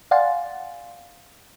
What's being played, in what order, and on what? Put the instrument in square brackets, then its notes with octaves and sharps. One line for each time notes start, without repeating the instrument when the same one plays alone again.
[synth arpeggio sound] D5 F5 F#5 G#5 C6 A6